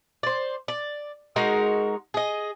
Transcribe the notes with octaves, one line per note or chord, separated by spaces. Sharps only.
C5 D5
D5
G#3 D#4 F#4 A#4
G#4 D#5